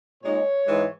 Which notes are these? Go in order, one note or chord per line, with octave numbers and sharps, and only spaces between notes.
A#2 G#3 D#4 C#5
G#2 E3 G#3